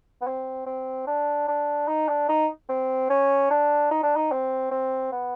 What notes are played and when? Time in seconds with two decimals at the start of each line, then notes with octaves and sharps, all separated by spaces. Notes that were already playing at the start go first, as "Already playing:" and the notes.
0.22 B3
0.27 C4
0.67 C4
1.07 D4
1.48 D4
1.88 D#4
2.08 D4
2.29 D#4
2.69 C4
3.10 C#4
3.51 D4
3.91 D#4
4.03 D4
4.16 D#4
4.32 C4
4.71 C4
5.12 B3